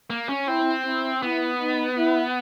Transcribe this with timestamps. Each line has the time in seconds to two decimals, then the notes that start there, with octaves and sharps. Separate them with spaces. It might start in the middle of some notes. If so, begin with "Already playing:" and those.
0.10 A#3
0.29 C#4
0.47 C4 E4
0.85 E4
1.22 B3 E4
1.60 D#4
1.97 E4